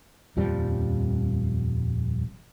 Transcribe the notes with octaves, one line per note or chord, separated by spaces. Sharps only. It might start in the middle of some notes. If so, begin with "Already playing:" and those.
D#1 F2 F3 G3